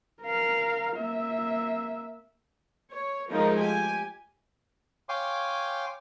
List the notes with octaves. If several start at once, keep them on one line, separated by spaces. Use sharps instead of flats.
A#4 F5
A#3 E5
C#5
F3 G#3 A3 D#4 A#4
G4 G#5
C#5 F5 G5 G#5 C6 D6